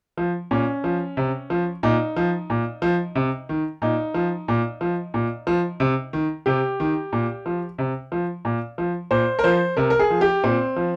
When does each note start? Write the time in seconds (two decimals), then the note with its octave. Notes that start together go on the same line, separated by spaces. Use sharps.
0.17 F3
0.51 A#2 C#4
0.84 F3
1.17 C3
1.50 F3
1.83 A#2 D#4
2.16 F3
2.50 A#2
2.82 F3
3.15 C3
3.49 D#3
3.82 A#2 D#4
4.14 F3
4.48 A#2
4.81 F3
5.14 A#2
5.47 F3
5.80 C3
6.13 D#3
6.46 C3 G4
6.80 D#3
7.13 A#2
7.46 F3
7.78 C3
8.12 F3
8.45 A#2
8.78 F3
9.11 A#2 C5
9.39 A#4
9.44 F3 C5
9.77 C3 A#4
9.90 A#4
9.99 G#4
10.10 F3
10.21 G4
10.44 A#2 C4
10.76 F3